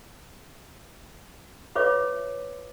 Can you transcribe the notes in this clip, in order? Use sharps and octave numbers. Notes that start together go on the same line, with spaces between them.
F4 B4 C#5 E5 D6